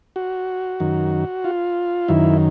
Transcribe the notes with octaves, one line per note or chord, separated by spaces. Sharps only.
F#4
F#2 D#3
F4
F#2 D#3 E4